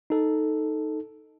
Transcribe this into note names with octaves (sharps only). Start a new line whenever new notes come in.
D#4 A4